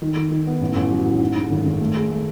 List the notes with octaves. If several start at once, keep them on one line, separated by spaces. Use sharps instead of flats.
D#3
D#3
D#3
B3
A1
A1
F#3
A2
G#2
G#2
G#1
G#1
A3
G#4
A3